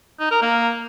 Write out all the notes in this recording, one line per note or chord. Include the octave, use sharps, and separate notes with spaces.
D#4
A#4
A#3